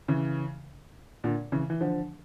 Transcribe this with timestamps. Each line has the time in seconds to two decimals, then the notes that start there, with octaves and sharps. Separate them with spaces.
0.08 C#3 E3
1.24 A#2 D3
1.52 C#3 E3
1.70 E3
1.81 D3 F3